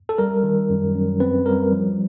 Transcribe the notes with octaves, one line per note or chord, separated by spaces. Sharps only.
A4
G3 A#4
D#3
F#2
F#2
C4 B4
G3 A#4
F3